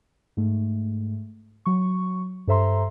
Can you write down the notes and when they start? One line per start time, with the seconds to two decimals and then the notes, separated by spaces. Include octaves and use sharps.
0.37 G#2 A3
1.65 F#3 C#6
2.47 G2 A4 C5 E5 A#5 C6